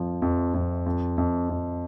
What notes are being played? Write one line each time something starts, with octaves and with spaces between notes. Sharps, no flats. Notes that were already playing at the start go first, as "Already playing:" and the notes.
Already playing: F2 F3
F2
F2
F2
F2
F2